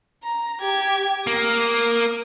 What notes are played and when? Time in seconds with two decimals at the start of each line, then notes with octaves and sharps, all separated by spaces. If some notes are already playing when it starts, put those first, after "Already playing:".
0.23 A#5
0.61 G4 G#6
1.27 A#3 D#6